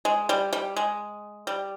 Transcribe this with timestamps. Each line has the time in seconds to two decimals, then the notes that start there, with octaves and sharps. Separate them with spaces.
0.05 G#3
0.29 G3
0.53 G3
0.76 G#3
1.47 G3